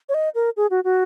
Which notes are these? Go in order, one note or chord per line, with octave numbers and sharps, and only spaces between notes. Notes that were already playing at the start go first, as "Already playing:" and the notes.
C#5
D#5
A#4
G#4
F#4
F#4